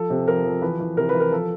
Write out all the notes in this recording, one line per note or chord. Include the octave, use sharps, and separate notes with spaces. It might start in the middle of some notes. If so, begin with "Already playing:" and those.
Already playing: F3 A4
C3
F3 A#4
F3
E3 B4
E3
C3 A#4
B4
E3
A#4
F3 A4